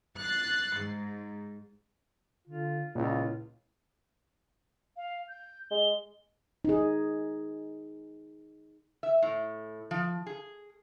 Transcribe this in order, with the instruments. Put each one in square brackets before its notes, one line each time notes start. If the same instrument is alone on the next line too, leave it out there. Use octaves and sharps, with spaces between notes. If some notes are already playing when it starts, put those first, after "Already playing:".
[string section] F#6 A6 C7
G#2
[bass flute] D3 [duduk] F4
[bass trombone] C#2 [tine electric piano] A#2 [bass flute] E4 [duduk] F4
[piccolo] F5
G6
[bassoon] G#3 [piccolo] G7
[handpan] D#4 G#4
[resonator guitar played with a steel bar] E5
A2
F3
G#4